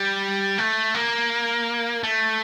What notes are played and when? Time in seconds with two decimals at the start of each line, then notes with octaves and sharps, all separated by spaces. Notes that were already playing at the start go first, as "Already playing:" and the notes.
Already playing: G3
0.58 A3
0.94 A#3
2.03 A3